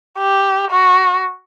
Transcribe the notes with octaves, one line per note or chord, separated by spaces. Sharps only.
G4
F#4